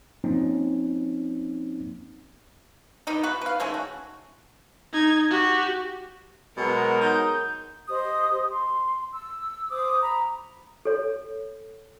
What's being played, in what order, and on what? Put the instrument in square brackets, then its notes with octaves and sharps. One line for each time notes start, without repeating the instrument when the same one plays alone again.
[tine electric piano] F3 A#3 C4 C#4 D#4
[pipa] D#3 B3 D#4 G4
B3 F#4 B4
B4 F5
D#3 G#3 A3 C#4
F#4
[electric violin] D#4 G#6
F#4 G4
[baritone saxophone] B2 [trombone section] F#3 G#3 B3 [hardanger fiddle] A#4
[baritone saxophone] D#4 [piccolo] G6
[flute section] G4 C5 D#5 D#6
C6
E6
C5 D6 D#6
A#5 B5
[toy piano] A4 C#5